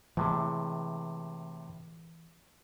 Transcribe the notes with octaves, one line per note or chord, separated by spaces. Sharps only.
A2 C3 E3 G#3